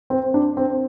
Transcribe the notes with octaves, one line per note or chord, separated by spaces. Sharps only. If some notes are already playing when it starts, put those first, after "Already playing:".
C4
D4
C4